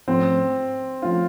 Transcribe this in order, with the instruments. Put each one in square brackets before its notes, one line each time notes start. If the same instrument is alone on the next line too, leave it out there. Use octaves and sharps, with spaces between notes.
[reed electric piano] G#2 F3 A3 C#4 [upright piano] C4
[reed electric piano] F3 A3 C#4 [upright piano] F4